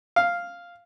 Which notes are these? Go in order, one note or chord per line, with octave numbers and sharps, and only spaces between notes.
F5